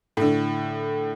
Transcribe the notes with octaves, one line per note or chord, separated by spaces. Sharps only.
A2 D3